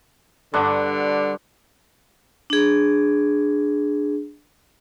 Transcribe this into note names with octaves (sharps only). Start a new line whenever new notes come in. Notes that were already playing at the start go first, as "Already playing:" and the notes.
G2 D3 D4 F#5
D4 G#4